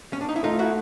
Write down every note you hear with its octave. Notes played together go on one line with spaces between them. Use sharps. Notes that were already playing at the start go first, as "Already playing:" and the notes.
C#4
D4
D#4
E4
A3 D#4 F4
E4 F#4